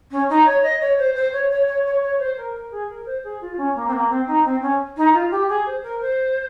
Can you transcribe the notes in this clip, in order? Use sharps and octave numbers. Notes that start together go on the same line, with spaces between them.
C#4
D#4
C#5
D#5
C#5
C5
C5
C#5
C#5
C#5
C#5
C#5
C5
A#4
A#4
G#4
A#4
C5
G#4
F4
C#4
A#3
C4
A#3
C4
D#4
C4
C#4
D#4
F4
G4
G#4
C5
A#4
C5